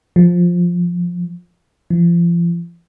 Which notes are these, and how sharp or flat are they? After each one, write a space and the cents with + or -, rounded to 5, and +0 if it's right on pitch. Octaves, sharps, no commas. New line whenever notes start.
F3 +5
F3 -35